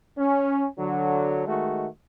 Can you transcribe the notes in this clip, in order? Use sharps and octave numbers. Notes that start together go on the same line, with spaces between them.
C#4
D3 F#3
D#3 G#3 A3 F#4